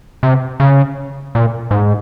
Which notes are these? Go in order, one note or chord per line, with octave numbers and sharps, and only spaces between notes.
C3
C#3
A#2
G#2